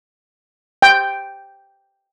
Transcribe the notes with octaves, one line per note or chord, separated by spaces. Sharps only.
G5